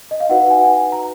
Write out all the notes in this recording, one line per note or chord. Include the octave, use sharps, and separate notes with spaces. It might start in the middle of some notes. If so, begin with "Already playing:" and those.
D#5
F5
D#4 F#4 B4 F#5
F#5
G#5
F#5
G#5
A#5